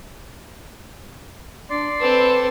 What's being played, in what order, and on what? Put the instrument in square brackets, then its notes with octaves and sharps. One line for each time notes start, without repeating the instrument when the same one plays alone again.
[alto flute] D4 [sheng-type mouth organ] D5 C6
[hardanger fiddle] C4 A4 [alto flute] B4